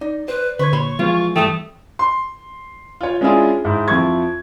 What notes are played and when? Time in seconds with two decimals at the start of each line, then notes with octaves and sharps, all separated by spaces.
0.01 D#4 D5
0.28 B4 C5
0.59 D3 B4 C5 C#6 G#6
0.73 A#2 C#5 B5 C6
0.99 E3 F3 G#3 B3 F4
1.36 G2 E3 A3 A4 G5 D#6
1.99 C6
3.01 F4 C#5
3.21 G#3 C#4 D4 E4 F4 G#4
3.65 G#2 E4
3.88 F2 F3 E4 F4 C#6 G#6